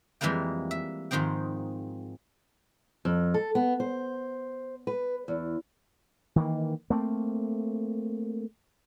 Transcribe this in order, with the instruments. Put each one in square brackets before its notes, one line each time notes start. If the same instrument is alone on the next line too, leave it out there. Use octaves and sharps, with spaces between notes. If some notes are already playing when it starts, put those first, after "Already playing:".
[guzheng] F2 E3 G3 G#3 A#3 G5
E5
G#2 D#3 F3 C4 G5
[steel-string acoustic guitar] F2
A4
B3
C5
B4
E2
[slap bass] D#3 E3 A#3
A3 A#3 C4